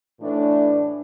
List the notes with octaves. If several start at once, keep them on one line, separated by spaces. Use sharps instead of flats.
A2 E3 A3 D4